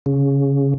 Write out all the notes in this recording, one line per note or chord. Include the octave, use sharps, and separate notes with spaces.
C#3